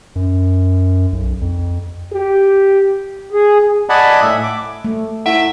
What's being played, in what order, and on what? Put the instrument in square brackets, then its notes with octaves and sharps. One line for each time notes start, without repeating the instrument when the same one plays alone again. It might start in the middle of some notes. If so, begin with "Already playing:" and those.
[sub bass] F#2
B1
F2
[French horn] G4
[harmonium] G#4
[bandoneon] D5 D#5 F#5 G#5 A5 B5
A2 E5
D6
[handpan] A3
[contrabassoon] A2 [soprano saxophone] E5 [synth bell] F#5